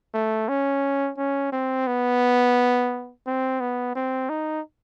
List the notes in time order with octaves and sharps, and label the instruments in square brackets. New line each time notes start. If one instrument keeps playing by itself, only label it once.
[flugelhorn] A3
C#4
C#4
C4
B3
C4
B3
C4
D#4